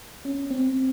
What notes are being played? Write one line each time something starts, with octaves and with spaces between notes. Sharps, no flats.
C#4
C4